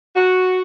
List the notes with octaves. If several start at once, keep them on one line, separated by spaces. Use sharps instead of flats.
F#4